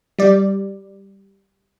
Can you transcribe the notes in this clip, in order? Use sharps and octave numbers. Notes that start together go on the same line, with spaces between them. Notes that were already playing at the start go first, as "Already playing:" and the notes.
G3 D5